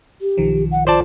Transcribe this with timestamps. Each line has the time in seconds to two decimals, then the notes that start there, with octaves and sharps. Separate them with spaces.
0.22 G4
0.38 B1 D#3 F3
0.71 F#5
0.87 F4 C5 D5 A5